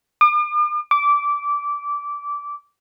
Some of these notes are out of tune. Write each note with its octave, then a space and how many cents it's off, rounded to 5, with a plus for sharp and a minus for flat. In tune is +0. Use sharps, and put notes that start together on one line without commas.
D6 +45
D6 -15